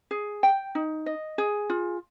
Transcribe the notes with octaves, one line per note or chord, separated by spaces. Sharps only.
G#4
G5
D#4
D#5
G#4
F4